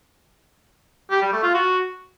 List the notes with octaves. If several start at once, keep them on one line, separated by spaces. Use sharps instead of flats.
G4
G3
A3
F4
F#4